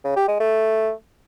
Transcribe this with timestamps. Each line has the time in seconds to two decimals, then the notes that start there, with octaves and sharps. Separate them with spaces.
0.04 C#3
0.16 G4
0.28 G#3
0.40 A3